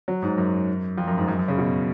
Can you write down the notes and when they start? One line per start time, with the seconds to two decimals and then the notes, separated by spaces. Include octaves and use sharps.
0.08 F#3
0.22 G#2
0.38 F#2
0.98 F2
1.08 F#2
1.18 G#2
1.28 F#2
1.39 F#2
1.48 C#3
1.58 B2